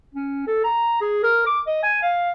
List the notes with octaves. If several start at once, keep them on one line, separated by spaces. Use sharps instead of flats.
C#4
A4
A#5
G#4
A#4
D6
D#5
G#5
F5